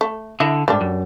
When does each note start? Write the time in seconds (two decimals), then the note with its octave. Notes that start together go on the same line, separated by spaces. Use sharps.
0.01 A3
0.40 D3 E4 D#5 E5
0.68 B1 G#2 G3 A3 D4
0.81 F#2